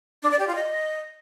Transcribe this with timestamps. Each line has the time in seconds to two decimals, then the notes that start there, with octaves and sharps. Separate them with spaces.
0.23 D4
0.31 D5
0.39 G4
0.47 F4
0.55 D#5